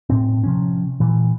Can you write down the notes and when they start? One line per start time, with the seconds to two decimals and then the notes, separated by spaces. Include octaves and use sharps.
0.10 A2 C4
0.44 C3 F3 C#4
1.00 A#2 E3